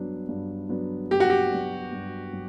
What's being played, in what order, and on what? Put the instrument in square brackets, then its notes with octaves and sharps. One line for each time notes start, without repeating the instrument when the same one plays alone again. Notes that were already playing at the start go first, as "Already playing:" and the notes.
Already playing: [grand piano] G2 F#3 B3 D4
G2
F#3 B3 D4
[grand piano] G2 [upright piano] G4
[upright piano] F#4
G4
[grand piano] F#3 B3 D4
G2
F#3